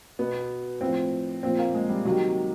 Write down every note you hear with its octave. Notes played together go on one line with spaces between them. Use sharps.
B2 B3
A2 F3 C4
A#2 F3 C4
A#3
G#3
G3
C3 D#3 F#3